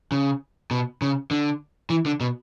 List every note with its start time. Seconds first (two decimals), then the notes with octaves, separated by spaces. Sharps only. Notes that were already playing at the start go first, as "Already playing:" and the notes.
0.12 C#3
0.71 B2
1.02 C#3
1.31 D3
1.90 E3
2.06 D3
2.21 B2